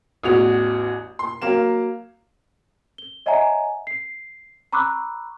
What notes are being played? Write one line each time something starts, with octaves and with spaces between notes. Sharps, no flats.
A1 E2 F#4 F7
C6
F#3 A#3 F5 E7
G7
C#5 D#5 E5 F#5 G#5 A#5
C7
A#5 B5 C#6 D6 E6 F#6